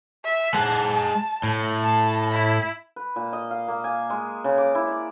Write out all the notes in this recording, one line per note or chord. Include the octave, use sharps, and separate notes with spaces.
E5
G#3 F#5 A5
A2
A5
E4
B4
A#2
D#5
F5
A#3
G#5
G#3
C#3
D6
E4
D5